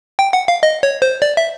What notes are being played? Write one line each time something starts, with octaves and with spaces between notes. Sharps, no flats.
G5
F#5
F5
D#5
C#5
C5
D5
E5